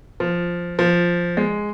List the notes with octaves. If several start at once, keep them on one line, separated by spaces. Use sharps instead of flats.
F3
F3
G#3